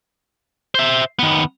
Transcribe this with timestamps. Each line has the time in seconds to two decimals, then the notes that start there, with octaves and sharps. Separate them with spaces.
0.75 C5 E5
1.19 D#3 B3